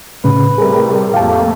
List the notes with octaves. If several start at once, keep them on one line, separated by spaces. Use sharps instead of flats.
A2 C#3 B4
A2 C3 G3 G#4 A#4
F2 A3 A#3 G4 F5 A5